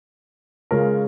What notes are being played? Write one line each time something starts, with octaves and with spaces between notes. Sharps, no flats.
C#3 G#3 C#4 F4 A#4